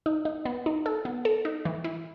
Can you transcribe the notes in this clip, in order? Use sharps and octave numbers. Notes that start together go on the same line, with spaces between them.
D#4
D#4
B3
D#4
A4
B3
A4
D#4
E3
E4